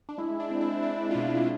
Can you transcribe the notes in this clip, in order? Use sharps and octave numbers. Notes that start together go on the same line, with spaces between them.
D4
G#3 E4
D4
C4
E4
C4 D4
F4
B2 E4
E4